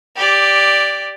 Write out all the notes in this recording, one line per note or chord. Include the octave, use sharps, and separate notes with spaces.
G4 D5